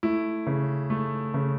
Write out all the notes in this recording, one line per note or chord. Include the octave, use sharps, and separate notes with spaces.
A3 E4
C#3
A3
C#3